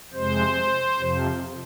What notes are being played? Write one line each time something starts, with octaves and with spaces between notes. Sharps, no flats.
F2 C3 G#3 C5
F2 C3 F3